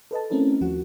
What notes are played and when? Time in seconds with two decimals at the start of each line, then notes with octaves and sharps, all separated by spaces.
0.11 A4 B4 D#5 A5
0.30 A3 C4 C#4 E4 A#4
0.61 D#2 F3 F#4 F#5